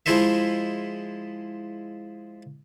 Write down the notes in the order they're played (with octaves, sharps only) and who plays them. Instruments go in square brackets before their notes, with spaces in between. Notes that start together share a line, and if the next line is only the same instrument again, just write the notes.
[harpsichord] F3 G#3 E4 C5 D#5 E5